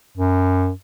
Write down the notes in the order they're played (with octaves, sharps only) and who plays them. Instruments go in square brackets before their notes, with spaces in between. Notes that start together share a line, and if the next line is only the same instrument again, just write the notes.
[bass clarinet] F#2